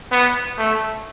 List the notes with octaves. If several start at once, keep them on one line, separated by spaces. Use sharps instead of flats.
B3
A3